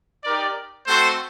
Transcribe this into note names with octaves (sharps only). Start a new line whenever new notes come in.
D#4 G4 A#4 D5
A3 C4 F#4 A4 C5